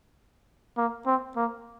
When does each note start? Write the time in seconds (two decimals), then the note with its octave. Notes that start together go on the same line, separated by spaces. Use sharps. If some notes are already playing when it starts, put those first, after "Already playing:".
0.77 A#3
1.06 C4
1.36 A#3